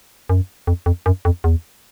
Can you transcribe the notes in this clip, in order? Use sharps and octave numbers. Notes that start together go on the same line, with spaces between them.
F#2
F2
F2
F#2
F2
E2